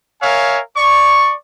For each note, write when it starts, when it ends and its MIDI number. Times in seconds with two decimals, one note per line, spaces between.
0.22 0.60 70
0.22 0.60 73
0.22 0.60 76
0.22 0.60 77
0.22 0.60 80
0.77 1.35 74
0.77 1.35 85